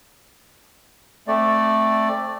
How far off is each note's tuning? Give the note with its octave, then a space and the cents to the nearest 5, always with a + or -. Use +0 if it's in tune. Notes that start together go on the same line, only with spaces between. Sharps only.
A3 +0 C4 +15 D5 +5